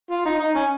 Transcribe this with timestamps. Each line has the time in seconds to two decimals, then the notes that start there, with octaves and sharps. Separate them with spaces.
0.10 F4
0.26 D#4
0.40 D#4
0.55 C#4